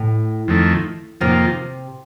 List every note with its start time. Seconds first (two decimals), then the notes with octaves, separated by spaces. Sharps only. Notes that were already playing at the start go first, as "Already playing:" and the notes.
Already playing: A2
0.48 F2 D#3 A3
1.21 F2 C3 D#3 A#3 F4